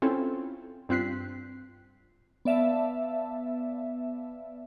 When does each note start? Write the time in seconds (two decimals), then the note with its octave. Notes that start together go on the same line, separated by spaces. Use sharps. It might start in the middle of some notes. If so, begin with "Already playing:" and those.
0.02 C4 C#4 E4 F4 A4
0.89 G2 C4 F4 F#6 B6 C7
2.45 B3 D5 E5 F5 A5